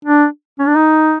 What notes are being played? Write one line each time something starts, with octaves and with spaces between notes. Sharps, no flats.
D4
C#4
D4
D#4